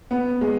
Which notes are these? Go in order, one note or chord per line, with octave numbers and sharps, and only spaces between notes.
B3
G#3